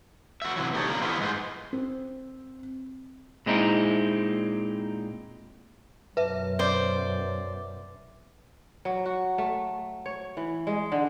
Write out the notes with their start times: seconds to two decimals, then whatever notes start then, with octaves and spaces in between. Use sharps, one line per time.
0.42 F#4 E5
0.56 C3 E3 F#3
0.74 A#3 D#4 G4 A4 C#5
0.89 B2 D3 F3 A#3
1.02 E3 F3 B3 E4 F4
1.20 G#2 G#3 C#4 B4 C5
1.73 C4
3.46 A#2 G#3 C4 D#4 E4
6.17 F#2 B2 B4 E5
6.59 C5 D5
8.85 F#3
9.05 F#4
9.38 A3
10.06 C#5
10.37 E3
10.67 G#3
10.92 D3